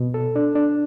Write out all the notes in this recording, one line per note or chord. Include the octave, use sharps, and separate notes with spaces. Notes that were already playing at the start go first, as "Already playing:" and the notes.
Already playing: B2
A4
D4
D4